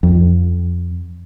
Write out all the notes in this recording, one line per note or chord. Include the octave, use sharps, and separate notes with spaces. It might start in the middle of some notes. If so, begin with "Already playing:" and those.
F2